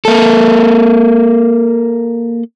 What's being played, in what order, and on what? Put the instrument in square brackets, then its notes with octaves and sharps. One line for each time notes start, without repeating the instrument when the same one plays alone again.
[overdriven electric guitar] A#3 A4